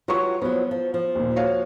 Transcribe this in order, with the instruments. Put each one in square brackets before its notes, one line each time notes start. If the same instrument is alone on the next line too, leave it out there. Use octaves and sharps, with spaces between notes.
[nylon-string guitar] F#3 G4 [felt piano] F4 B4 C#6
[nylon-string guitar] F3 F#3 [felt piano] B3
[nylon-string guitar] F3
F3
[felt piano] D#2 A#2
F#4 C#5 F5